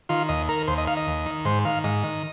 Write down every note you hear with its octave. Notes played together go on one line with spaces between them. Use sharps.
D#3 F4
D#2 D#5
D#3 A#4
D#2 C5
D#5
D#3 F5
D#5
D#2
D#3
G#2 C5
D#3 F5
G#2 D#5
D#3